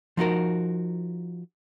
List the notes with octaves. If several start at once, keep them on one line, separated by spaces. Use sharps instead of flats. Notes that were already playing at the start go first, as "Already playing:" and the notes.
F3 D#4 F#4 A#4